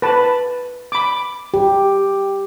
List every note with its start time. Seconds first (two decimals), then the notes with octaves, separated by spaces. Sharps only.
0.02 B4 A5
0.92 B5 D6
1.54 G4